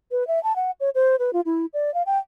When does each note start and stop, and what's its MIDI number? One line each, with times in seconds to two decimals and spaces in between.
0.11 0.26 71
0.28 0.42 76
0.43 0.55 81
0.56 0.71 78
0.80 0.90 73
0.95 1.16 72
1.19 1.33 71
1.33 1.41 65
1.45 1.66 64
1.74 1.93 74
1.94 2.02 77
2.06 2.18 79